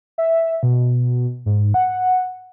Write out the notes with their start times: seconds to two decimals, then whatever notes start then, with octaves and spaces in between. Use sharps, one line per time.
0.18 E5
0.63 B2
1.46 G#2
1.74 F#5